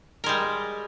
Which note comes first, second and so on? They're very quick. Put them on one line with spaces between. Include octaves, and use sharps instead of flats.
A#4 G#3 G3